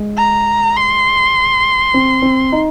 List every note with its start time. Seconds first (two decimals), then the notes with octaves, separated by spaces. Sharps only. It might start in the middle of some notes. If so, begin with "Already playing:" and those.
Already playing: G#3
0.17 A#5
0.76 C6
1.94 C4
2.22 C4
2.52 D#4